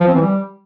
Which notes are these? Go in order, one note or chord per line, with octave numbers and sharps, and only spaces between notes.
F3
C4
E3
G3